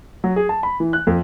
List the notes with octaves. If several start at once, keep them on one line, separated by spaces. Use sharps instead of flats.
F#3
G#4
A5
B5
E3
F#6
F2